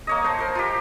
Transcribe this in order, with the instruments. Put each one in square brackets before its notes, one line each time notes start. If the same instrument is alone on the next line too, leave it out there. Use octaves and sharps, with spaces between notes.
[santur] A#3 C#5 D#5
C5 F#5 A5
A#4 C5
F4 G4